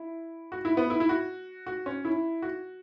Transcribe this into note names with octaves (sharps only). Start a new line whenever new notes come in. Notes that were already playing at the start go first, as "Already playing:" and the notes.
Already playing: E4
F#4
E4
B3
E4
E4
F#4
F#4
C#4
E4
F#4